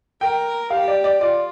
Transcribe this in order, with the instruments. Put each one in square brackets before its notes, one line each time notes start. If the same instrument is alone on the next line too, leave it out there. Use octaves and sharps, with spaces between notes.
[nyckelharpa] A#4 [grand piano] G5
[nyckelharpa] G4 [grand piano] F5
[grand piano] D5
D5
[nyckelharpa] F4 [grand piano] D5